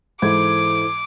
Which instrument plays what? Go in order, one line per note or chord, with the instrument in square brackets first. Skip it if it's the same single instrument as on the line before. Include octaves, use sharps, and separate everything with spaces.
[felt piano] G#2 E3 G#6 [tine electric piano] E4 A4 C5 [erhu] D6